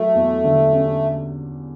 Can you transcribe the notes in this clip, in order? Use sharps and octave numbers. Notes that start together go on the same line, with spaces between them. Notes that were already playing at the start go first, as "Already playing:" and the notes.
Already playing: F#3 A3
E2
D3
C#4